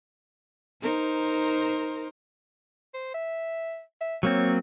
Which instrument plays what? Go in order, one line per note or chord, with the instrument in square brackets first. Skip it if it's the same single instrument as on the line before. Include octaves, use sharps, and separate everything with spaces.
[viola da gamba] D#4 A#4 C5
[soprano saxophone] C5
E5
E5
[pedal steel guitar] F#3 A#3 C4 [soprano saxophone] C#5